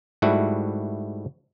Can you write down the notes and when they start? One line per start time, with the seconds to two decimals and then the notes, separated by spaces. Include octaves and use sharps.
0.22 G#2 G3 A3 E4 F#4